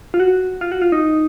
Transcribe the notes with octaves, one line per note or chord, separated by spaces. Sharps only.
F4
F#4
F4
F#4
F4
D#4